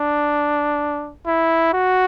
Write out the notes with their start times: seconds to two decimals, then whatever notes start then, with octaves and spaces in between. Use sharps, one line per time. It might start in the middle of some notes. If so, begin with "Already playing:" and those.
Already playing: D4
1.26 E4
1.73 F#4